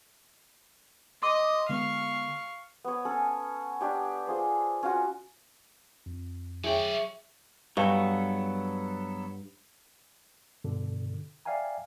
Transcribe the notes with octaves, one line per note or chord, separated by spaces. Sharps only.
D#5 C6 D6 D#6
D3 G#3 B3 F5 C#6
B3 C#5
C#4 A4
D4 G4 C#5
F4 G#4 C5
C#4 F4 F#4
F2
F#3 G#4 C#5 D5 E5 G5 C#6
G2 F#3 B3 A4 F5
G2 B2 D3
D5 E5 F5 G5 G#5 A#5